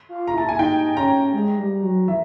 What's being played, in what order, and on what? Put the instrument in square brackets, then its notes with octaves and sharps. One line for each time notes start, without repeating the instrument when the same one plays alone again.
[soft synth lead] F4
[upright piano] A#5
[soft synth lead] E4 [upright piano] A5
[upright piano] G#5
[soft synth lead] D#4 [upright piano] G5
[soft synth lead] C#4 [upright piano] A#5
[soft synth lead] G#3
G3
F#3
[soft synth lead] E3 [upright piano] E5